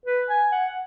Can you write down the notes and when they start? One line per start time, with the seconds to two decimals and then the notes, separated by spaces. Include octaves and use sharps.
0.06 B4
0.29 G#5
0.52 F#5